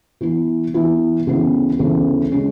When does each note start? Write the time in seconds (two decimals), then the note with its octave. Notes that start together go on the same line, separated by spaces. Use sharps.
0.21 E3 B3 E4
0.74 E3 B3 E4
1.27 D2 C#3 E3 B3
1.79 D2 C#3 E3 B3
2.32 C#3 G#3 C#4 G#4